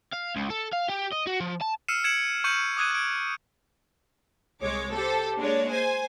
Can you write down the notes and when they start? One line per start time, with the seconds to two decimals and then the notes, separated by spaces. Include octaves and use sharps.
0.13 F5
0.36 C#2
0.50 A4
0.73 F5
0.88 G4
1.12 D#5
1.27 F#4
1.40 F3
1.62 A5
1.88 E6 F6 C7 C#7 D#7 E7
2.04 G#6 C#7 D7 E7 F#7
2.44 C#6 G6 C#7 D#7 F#7
2.77 D6 D#6 F#6 G#6 D#7
2.91 G#6 D7
4.62 C2 G#3 C#5 D6
4.93 G4 A4 C5
5.38 G#3 A#3 D4 C#5
5.70 C5 G#5